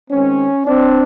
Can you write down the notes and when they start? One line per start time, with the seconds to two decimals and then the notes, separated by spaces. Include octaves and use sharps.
0.11 D#3 G#3 C4 C#4
0.66 C4 D4